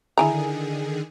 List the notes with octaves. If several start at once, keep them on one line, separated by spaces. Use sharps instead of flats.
D3 D#3 E4 G#4 G#5 A#5